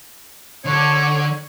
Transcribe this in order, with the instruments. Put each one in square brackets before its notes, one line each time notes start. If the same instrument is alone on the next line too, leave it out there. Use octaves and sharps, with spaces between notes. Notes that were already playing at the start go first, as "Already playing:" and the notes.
[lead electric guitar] D3 [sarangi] C#5